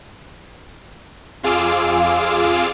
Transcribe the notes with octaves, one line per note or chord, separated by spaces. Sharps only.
F2 F4 G#4 F5 D6 E6